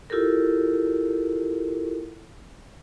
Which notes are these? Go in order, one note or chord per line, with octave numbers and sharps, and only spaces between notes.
E4 F4 G4 A4 A#4